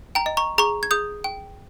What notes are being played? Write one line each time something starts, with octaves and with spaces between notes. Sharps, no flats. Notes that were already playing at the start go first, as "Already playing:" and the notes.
G5 A#5
D#5
A#5 C#6
G#4 A#5 C#6
G#6
G#4 D#6 G6
G5